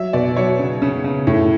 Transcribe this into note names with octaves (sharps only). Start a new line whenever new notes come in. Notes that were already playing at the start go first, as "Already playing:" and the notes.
Already playing: F#3 E5
B2 D5
F#3 C#5
C#3
C#3
C#3
A2